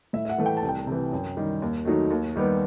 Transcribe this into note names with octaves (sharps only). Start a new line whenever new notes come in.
A2 E5
E5
F#5
E3 A3
G5
A5
C2
G5
C3 E3
F#2
D#3 G3
D#2
D#3 F#3 A3 D#4
D#2
D#3 G3 B3